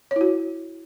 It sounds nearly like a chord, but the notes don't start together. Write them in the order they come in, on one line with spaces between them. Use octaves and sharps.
C#5 E4 F#4